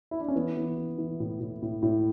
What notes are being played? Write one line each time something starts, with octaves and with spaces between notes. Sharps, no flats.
E4
D4
C#4
E3 B3
E3
E3
E3
A2
A2
A2
A2